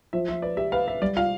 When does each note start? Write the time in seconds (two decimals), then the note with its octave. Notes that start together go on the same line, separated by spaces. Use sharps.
0.13 F3 E5
0.28 F3 E5
0.42 B4 D5
0.57 G4 E5
0.72 B4 F5
0.88 B4 E5
1.01 G3 D5
1.17 F4 F5